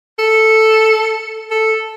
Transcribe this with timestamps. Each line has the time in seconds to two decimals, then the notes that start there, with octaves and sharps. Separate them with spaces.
0.19 A4
1.51 A4